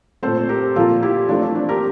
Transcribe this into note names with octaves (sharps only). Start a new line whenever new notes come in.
A#2 A3 C4 A4 C5
G4 A#4
A#2 F3 A#3 F4 A4
E4 G4
E3 A3 C4 D4 F4
D4
D4
G4 A#4